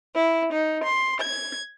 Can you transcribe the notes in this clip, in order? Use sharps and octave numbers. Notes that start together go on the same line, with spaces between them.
E4
D#4
C6
G#6